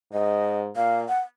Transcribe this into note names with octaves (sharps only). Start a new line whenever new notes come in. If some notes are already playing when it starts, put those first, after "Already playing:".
G#2 D#5
A#2 F5
F#5